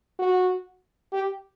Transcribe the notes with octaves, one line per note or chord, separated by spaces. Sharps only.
F#4
G4